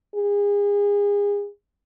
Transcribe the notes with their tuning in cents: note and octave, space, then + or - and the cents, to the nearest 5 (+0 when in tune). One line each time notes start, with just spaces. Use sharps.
G#4 -35